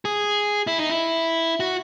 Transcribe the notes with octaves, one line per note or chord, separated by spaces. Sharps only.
G#4
E4
D#4
E4
F#4